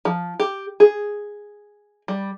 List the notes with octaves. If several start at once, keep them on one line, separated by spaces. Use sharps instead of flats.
F3
G4
G#4
G3